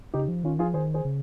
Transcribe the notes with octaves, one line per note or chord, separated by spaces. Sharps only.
C#3 D#4 G4
F3
D#3 C#4 F4
F3 F4 G#4
D#3 G#4 C5
G#4 C5
C#3